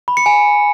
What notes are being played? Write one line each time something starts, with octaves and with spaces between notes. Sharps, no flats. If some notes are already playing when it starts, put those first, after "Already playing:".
B5
C#7
G#5